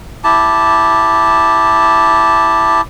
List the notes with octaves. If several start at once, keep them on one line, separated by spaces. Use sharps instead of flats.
E4 G4 A5